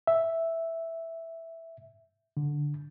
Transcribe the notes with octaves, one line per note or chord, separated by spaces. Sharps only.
E5
D3